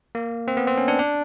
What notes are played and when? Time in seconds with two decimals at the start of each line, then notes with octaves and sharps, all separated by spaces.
0.15 A#3
0.48 C4
0.57 B3
0.67 C4
0.77 C#4
0.88 D4
0.99 D4